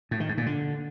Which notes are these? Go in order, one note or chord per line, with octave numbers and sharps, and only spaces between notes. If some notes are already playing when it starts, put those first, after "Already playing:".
A2
D#3
G#2
A#2
D3